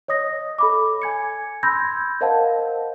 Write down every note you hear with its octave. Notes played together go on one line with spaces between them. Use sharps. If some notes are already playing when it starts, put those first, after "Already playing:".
C#5 D#5 D#6 A#6
A4 B5 D6
G#5 G#6 C#7
B5 C6 E6 G6 G#6 A#6
A#4 C5 D#5 F5 F#5 A5